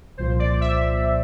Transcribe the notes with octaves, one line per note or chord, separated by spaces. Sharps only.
C2 A#2 F3 C5
D5
E5